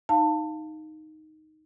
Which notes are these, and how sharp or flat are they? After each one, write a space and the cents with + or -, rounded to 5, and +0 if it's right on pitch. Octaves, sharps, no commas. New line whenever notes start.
D#4 +0 F5 +0 A5 +20